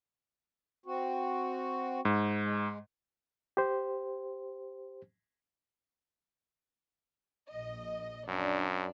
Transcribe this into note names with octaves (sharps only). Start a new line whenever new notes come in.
C4 F#4
G#2
G#3
G4 C5
A#1 D#5
F#2 D4